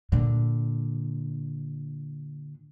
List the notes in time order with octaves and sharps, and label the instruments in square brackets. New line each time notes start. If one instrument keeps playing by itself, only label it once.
[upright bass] A#2 D3